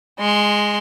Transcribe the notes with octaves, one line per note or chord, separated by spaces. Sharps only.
G#3 C6